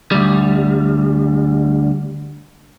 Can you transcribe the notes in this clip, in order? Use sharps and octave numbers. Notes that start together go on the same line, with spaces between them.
D2 G3